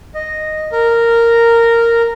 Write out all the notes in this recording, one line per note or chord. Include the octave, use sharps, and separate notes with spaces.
D#5
A#4